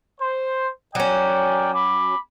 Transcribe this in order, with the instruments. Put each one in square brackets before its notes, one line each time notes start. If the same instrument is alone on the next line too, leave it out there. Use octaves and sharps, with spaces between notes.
[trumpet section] C5
[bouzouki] F#3 C#4 [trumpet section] A#4 D5 G5
[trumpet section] B5 D6